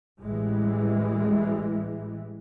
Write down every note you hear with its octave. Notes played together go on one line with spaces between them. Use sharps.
A1 E3 G3 G#3